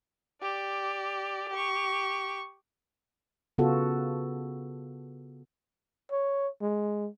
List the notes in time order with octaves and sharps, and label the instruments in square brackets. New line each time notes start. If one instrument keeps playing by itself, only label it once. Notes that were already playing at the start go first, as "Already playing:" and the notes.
[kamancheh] G4 D5
G4 C#6
[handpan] C#3 B3 F4 F#4 A4
[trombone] C#5
G#3